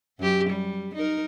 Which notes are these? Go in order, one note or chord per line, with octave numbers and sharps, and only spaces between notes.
F#2 G4
G3
D#4 A#4